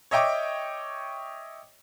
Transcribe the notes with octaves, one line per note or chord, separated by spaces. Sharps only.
C#5 D#5 E5 G5 C#6 D6